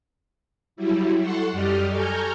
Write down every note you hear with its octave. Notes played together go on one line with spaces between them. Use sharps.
F#3 G3 E4
A4 F#5 C6 C#6
F#2 G3 G4 D5 D#5 F6
A4 G#5 A#5 C#6 F6 G6